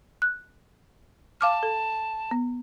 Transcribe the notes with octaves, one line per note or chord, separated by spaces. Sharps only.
F#6
F5 A5 D6 F6
A4
B3